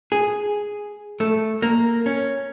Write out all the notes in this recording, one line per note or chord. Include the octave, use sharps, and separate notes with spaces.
G#4
A3
A#3
C#4